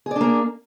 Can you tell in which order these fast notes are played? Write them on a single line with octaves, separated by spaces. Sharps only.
G#4 D5 D4 A#3